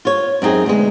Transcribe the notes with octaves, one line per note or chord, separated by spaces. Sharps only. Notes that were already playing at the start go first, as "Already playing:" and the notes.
F4 C#5
F#2 C4 D#4 G#4
D2 B2 G#3